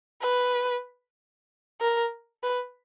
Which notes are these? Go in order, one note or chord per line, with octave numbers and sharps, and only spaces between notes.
B4
A#4
B4